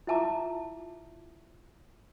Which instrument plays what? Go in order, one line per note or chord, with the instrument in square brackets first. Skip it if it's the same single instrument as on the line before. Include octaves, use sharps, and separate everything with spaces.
[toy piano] E4 F4 E5 A5 A#5 D6